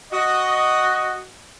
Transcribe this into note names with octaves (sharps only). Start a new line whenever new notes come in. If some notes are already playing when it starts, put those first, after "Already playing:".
F#4 D#5